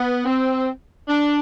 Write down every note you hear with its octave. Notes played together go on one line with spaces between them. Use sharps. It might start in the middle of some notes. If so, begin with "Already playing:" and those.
Already playing: B3
C4
D4